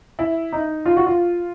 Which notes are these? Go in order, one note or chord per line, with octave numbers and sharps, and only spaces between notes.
E4
D#4
F4
F#4
F4